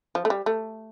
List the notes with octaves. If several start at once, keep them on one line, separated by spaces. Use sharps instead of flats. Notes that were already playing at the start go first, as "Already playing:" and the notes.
F3
A3
G3
A3